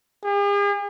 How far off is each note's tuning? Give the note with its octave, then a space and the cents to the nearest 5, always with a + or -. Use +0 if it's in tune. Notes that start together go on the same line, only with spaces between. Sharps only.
G#4 -45